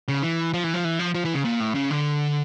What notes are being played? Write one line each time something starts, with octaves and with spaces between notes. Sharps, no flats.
C#3
E3
F3
E3
F3
E3
F3
F3
E3
C#3
A#2
A2
C#3
D3